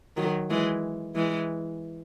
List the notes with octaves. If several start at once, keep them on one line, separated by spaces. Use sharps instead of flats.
D#3 F#3
E3 G#3
E3 G#3